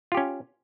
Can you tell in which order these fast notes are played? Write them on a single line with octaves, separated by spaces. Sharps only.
F4 G4 C#4